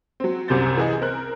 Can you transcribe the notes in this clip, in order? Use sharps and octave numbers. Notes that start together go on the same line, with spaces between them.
F#3 C4
C2 F#2 C3 C5 G6 A6
E3 G#4 D#5
C4 A#4 F#6